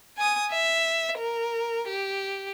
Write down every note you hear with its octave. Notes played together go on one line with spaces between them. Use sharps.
G#5 D#6
E5
A#4
G4